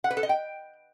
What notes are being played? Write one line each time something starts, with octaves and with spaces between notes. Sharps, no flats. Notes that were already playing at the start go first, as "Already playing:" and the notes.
F#5
B4
A4
D#5
G5